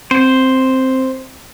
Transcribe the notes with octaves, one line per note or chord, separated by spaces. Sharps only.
C4 C5